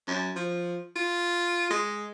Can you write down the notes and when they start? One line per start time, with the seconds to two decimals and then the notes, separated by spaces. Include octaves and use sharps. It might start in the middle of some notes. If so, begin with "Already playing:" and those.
0.08 F#2
0.36 F3
0.96 F4
1.70 G#3